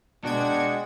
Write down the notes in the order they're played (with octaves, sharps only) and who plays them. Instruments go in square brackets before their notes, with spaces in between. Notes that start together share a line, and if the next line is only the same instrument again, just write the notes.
[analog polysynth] B2 G5 G#6 [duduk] G#3 [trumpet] D4 [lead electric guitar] F#4